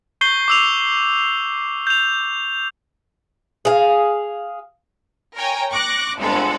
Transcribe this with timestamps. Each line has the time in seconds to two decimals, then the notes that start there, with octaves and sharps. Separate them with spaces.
0.21 C#6 G6 C7 G7
0.48 D6 E6 F7
1.87 G6 F7
3.65 G#4 F5
5.36 A#4 C#5 G5 G#5 A#5
5.70 C#6 D6 F#6 A#6
6.18 G1 F2 G#3 A4 F#5